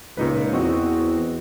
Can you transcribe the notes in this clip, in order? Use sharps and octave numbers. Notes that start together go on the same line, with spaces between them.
C#2 A#2 D#4 B4
E2 C4 F#4 D#5